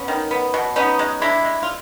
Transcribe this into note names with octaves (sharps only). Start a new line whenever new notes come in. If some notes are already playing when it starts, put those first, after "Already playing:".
Already playing: B3 C#4
D#3
B3
B2
B3 C#4 D#4
G#3
G#3 D4 E4
G#3
F4